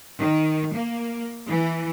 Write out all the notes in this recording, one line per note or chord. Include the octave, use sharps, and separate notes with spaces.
D#3
A#3
E3